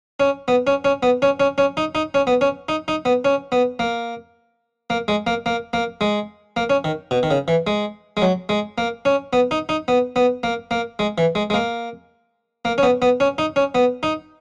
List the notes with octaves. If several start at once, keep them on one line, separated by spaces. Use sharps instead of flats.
C#4
B3
C#4
C#4
B3
C#4
C#4
C#4
D#4
D#4
C#4
B3
C#4
D#4
D#4
B3
C#4
B3
A#3
A#3
G#3
A#3
A#3
A#3
G#3
A#3
C#4
D#3
B2
D#3
C#3
E3
G#3
G#3
F#3
G#3
A#3
C#4
B3
D#4
D#4
B3
B3
A#3
A#3
G#3
E3
G#3
G#3
A#3
A#3
C#4
B3
B3
C#4
D#4
C#4
B3
D#4